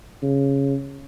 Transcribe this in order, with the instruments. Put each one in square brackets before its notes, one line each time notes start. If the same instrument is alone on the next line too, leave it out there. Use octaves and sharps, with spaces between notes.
[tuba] C#3